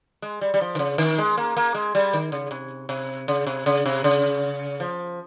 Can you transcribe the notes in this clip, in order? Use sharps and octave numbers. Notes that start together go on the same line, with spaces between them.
G#3
G3
G3
F3
D#3
C#3
D#3
G#3
A#3
A#3
G#3
G3
D#3
C#3
C3
C3
C#3
C3
C#3
C3
C#3
F3